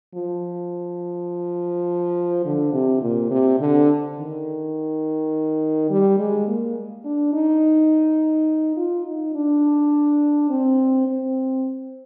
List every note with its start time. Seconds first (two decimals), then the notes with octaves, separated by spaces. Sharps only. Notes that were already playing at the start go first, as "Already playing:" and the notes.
0.15 F3
2.46 D3
2.74 C3
3.02 A#2
3.31 C3
3.60 D3
4.18 D#3
5.90 G3
6.18 G#3
6.48 A#3
7.05 D4
7.33 D#4
8.77 F4
9.06 D#4
9.35 D4
10.50 C4
11.07 C4